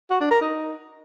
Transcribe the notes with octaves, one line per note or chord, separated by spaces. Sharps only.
F#4
D4
A#4
D#4